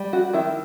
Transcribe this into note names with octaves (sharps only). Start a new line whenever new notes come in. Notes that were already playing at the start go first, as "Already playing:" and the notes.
Already playing: G3
F#4
D#3 E4